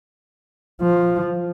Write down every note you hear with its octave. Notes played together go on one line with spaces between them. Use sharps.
F3